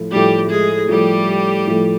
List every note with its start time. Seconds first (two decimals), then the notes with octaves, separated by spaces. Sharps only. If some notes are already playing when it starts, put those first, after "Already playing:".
Already playing: A2 F3 A3
0.11 A2 F3 G3 A3 G4
0.50 G#3 G#4
0.89 A2 F3 G3 A3 G4
1.67 A2 F3 A3